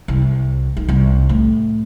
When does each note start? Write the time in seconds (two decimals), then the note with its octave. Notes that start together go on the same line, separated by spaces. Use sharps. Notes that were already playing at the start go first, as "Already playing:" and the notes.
0.08 C2
0.77 D#3
0.88 C2
1.29 A2